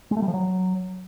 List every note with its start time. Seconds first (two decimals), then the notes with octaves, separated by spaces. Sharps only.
0.11 G#3
0.17 A3
0.22 G3
0.28 F3
0.34 F#3